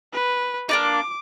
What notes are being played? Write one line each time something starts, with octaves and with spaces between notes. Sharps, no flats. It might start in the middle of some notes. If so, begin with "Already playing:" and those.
B4
A#3 D4 D#4 D6